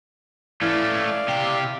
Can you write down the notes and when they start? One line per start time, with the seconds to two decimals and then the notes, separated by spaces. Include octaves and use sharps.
0.61 E3 A3 C#4 D5 F5
1.28 C3 G4